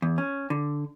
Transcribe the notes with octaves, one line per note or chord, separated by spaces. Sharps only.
E2
C#4
D3